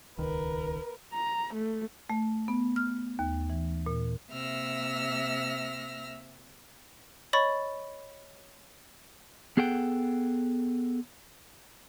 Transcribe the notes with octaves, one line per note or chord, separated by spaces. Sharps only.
D#1 C#2 D#3 A#4 B4
A#5
A3
A3
B3
F6
D#2
E3
A#2
C3 A#3 E5 E6 F6 A#6
C#5 D#5 B5 C#6 A6
B3 G#4 A4 F#5 G5